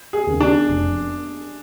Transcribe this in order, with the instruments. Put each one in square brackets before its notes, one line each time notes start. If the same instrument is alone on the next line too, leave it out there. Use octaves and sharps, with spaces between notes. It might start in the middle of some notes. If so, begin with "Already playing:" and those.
[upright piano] G#4
[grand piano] D#2 C#3
[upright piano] D4
[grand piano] F1